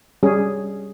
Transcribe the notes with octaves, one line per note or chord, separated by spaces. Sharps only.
G3 C#4 G#4